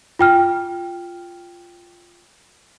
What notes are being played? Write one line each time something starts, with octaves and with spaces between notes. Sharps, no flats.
F4 G5 F6